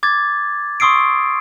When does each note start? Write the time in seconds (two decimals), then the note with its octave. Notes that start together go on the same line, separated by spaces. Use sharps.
0.03 D6 G#6 A6
0.80 C6 C#6 D#6 E6 C7 D7